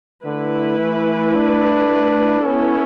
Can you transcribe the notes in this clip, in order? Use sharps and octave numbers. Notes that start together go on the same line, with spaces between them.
D3 A3 E4 B4
E3
D4
B3 C#4 E4 A4 C#5